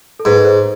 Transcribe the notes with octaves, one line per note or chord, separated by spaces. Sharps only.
A4
G#2 B4
C5